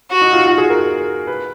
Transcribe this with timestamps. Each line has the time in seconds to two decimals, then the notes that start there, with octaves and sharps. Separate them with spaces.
0.12 F#4
0.21 D#4
0.33 F4
0.46 F#4
0.58 G#4
0.70 A#4
1.27 B4